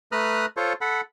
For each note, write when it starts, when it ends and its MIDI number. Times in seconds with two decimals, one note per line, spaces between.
0.12 0.46 57
0.12 0.46 71
0.12 0.46 82
0.12 0.46 87
0.12 0.46 89
0.12 0.46 90
0.57 0.73 65
0.57 0.73 69
0.57 0.73 72
0.57 0.73 73
0.81 1.01 69
0.81 1.01 78
0.81 1.01 83